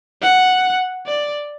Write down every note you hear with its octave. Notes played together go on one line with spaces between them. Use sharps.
F#5
D5